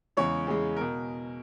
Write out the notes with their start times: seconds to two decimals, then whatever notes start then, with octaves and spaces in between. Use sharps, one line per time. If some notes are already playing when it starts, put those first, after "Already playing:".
0.17 E2 C#3 G#3 C#5
0.47 E2 C#3 G#3
0.77 B2 A#4